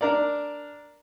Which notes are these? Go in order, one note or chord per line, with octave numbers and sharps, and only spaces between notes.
D4 A#4 D5